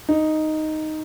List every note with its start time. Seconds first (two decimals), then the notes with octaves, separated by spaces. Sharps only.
0.09 D#4